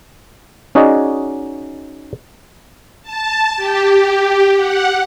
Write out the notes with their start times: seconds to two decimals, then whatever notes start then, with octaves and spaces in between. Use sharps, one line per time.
0.75 C#4 D#4 F#4 G#4 D5 D#5
3.03 A5
3.56 G4
4.55 F#5